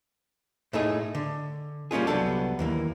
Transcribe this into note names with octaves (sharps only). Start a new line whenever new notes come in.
A2 A3 D#4 G#4
D3
G3 A#3 C#4 F4 G#4
C2 F#3 G3 B3 D4 A4
D#2 E3 A#3